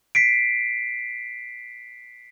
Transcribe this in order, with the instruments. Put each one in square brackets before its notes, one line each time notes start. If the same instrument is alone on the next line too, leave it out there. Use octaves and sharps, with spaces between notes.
[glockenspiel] B6 C7 D7